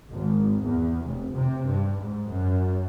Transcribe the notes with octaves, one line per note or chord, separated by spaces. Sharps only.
G#1
E2
F1
C3
G2
G#2
F#2